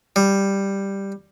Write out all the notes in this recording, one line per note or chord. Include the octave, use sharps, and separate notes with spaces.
G3